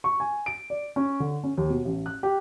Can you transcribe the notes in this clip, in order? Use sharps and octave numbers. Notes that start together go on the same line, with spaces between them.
C#6
G#5
D7
D5
C#4
D3
C#4
D#2
B2
A1
F#6
G4